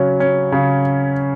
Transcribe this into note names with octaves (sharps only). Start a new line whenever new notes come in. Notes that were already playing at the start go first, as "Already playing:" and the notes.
Already playing: C#3 F#3 C#4
C#4
C#3